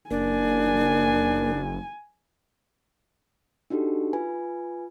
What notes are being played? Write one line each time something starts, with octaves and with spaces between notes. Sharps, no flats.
F#1 A#3 D4 G#5
D4 D#4 F#4 G4 A4
F4 B4 G#5